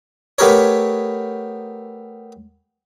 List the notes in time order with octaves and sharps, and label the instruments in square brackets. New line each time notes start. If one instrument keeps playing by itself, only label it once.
[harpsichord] A3 B3 G4 A4 A#4 C#5